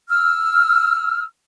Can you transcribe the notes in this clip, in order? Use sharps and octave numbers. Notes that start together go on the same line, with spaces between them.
E6 F6